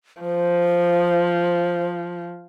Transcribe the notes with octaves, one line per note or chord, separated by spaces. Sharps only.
F3 C5